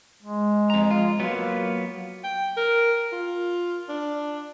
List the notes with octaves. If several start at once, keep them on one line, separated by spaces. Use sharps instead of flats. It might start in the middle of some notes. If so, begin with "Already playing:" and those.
G#3
F2 A#5
F4
F#3 A#3 B3 F4
G5
A#4
F4
D4